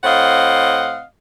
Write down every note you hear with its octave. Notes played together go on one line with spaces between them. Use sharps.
A2 C4 D#5 F5 F#5